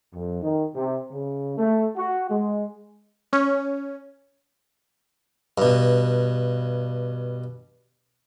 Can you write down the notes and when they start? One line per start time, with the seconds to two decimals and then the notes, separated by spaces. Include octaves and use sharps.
0.14 F2
0.42 D#3
0.75 C3
1.11 C#3
1.57 A3
1.96 F#4
2.29 G#3
3.33 C#4
5.58 G2 B2